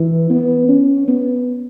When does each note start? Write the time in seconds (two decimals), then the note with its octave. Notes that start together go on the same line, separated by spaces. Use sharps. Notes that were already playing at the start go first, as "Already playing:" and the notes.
Already playing: E3
0.30 B3
0.68 C#4
1.08 B3